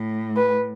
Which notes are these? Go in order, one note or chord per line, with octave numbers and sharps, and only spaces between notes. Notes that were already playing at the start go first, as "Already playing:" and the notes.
Already playing: A2
B4